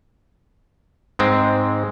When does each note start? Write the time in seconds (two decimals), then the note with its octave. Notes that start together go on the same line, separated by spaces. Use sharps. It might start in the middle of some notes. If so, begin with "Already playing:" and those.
1.19 G#2 G#3 C4